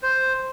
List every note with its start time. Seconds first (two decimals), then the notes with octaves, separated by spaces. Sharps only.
0.03 C5